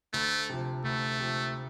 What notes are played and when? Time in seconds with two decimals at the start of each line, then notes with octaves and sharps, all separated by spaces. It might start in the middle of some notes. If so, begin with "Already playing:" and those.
0.14 D2 A3
0.49 C3 F3
0.84 D2 A3
1.19 C3 F3